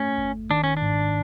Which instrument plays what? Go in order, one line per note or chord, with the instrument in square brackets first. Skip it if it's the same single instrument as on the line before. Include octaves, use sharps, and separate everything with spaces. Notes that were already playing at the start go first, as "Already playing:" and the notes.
Already playing: [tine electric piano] A3 [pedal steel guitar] C#4
[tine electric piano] G1
[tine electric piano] D#3 [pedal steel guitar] D4
[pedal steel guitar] C#4
D4
[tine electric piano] G#2